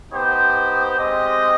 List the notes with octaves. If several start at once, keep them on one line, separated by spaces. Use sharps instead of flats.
B3 D#4 G4 C5
G#3 C4 G4 D#5